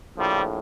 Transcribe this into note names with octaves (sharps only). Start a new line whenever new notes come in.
A#1 A2 F3 G3